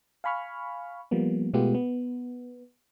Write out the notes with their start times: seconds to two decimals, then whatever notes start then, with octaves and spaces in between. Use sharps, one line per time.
0.24 F5 G#5 B5 C#6 F6
1.11 F3 G3 A#3 B3
1.54 B2 G#3 A3 B3 F4 G4
1.74 B3